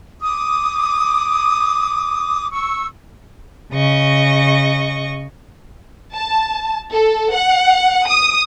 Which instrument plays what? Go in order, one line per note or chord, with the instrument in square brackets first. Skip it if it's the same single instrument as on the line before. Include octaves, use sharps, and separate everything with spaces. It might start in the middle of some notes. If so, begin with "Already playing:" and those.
[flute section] D6 D#6
C#6 E6
[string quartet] C#3 D#5 C#6
[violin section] A5
A4
F#5
D#6